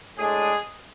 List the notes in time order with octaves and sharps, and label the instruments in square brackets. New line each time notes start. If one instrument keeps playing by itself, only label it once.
[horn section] A2 G#3 D4 G#4